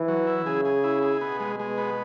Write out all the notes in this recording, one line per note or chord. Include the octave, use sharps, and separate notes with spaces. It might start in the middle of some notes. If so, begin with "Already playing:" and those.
Already playing: E3
F#3
E4
C#3 G#4
G#4
E4
G#4
B2 B3
G#3
G#3
B3